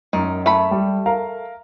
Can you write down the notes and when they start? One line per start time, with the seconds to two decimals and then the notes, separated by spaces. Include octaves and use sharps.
0.13 F#2 D#3
0.46 A3 B5
0.71 G3
1.06 A#4 F5 A#5